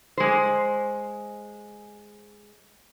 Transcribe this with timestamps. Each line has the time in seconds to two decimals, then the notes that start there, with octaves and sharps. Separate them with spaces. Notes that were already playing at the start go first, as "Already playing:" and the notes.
0.17 G#3 C5